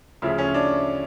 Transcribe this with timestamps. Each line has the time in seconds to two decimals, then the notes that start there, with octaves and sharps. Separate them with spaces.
0.22 D2 C#3 F3 E4
0.38 C#4
0.54 D4